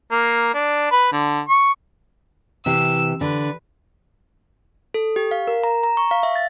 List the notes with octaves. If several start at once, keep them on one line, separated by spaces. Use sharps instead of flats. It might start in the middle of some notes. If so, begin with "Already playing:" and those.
A#3
D4
B4
D3
C#6
C3 E3 E6
D3 B4
A4
G4
F5
A#4
A#5
A#5
C#6
F5
E5
A6